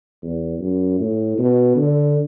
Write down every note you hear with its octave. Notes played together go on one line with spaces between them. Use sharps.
E2
F#2
A2
B2
D3